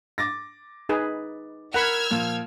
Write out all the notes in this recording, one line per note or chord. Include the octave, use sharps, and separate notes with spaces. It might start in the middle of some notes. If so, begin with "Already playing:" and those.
D6 A6 A#6
D#4 G#4 B4
A#4 F#5 B5 E6 F6 G#6
A#2 F3